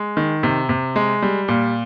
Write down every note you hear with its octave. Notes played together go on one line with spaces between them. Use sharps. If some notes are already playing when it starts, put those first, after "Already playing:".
Already playing: G#3
D#3
C3
C3
G#3
G3
A#2